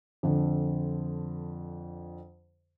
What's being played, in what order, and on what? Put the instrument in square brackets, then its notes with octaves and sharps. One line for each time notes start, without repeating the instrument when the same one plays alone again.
[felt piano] F2 D3